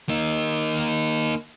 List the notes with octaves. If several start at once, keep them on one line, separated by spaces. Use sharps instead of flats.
A#3 D#4